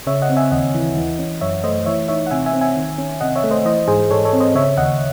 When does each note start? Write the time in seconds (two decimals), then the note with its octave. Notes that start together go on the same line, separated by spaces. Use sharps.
0.07 C#3 C#5 E5
0.22 D#5 F#5
0.29 C4
0.37 E5 G#5
0.51 D#2 D#5 F#5
0.74 E3
0.97 E3
1.19 C#4
1.41 F#2 C#5 E5
1.64 A3 C5 D#5
1.86 E3 C#5 E5
2.08 D#4 C#5 E5
2.27 F#5
2.31 C3 E5 G#5
2.46 E5 G#5
2.54 C4
2.61 E5 G#5
2.76 D#3
2.98 C#4
3.21 C3 D#5 F#5
3.36 C#5 E5
3.44 A3
3.51 C5 D#5
3.65 E3 C5 D#5
3.88 G#2 G#4 C5
4.10 G#2 A4 C#5
4.25 A4 C#5
4.33 C4
4.40 C5 D#5
4.55 C#3 C#5 E5
4.77 D#2 D#5 F#5